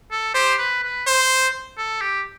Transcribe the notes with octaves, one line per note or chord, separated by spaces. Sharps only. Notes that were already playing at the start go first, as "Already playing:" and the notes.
A4
G4 C5
B4
B4
C5
A4
G4